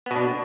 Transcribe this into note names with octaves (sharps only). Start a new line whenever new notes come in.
B2 B3 D4